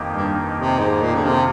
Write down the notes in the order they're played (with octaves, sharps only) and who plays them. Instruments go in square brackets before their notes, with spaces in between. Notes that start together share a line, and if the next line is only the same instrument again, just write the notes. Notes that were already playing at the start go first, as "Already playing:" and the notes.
Already playing: [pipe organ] F2 D#3 A#3 D#4 G4
[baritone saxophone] G2
C3
G#2
A#2
D3
C3